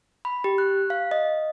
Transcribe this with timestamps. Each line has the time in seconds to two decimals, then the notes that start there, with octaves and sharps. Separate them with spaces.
0.25 B5
0.44 G4
0.58 F#6
0.90 F5
1.11 D#5